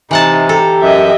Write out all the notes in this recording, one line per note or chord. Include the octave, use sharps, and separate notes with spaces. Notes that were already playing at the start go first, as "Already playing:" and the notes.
C3 E3 D#4 F#5 A5
G4 A4 A#5
F#2 D#5 E5